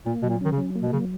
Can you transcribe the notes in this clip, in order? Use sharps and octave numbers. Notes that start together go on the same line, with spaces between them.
A#2 A#3
B2 F#3
A#2
D#3 C#4
C#3
F#3
A#3
B2
C#3 F#3